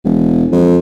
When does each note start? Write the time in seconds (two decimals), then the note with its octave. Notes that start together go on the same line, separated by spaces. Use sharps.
0.05 E1
0.52 F2